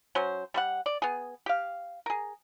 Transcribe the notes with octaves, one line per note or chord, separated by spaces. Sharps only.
F#3 C#4 C5
G3 C5 F#5
D5
B3 G#4
G4 F5
G#4 A#4